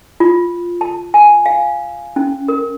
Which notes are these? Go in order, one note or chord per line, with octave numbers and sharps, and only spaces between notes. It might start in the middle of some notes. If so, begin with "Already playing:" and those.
F4
A5
G#5
F5
C#4
A#4